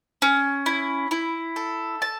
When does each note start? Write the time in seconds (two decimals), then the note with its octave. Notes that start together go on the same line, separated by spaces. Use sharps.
0.22 C#4
0.66 E4
1.11 E4
1.56 A4
2.02 A5